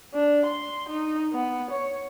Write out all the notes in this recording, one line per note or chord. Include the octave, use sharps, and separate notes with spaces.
D4
C6
D#4
B3
C#5